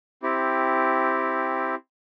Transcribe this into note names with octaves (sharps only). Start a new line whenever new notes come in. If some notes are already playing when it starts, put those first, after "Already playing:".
C4 E4 G4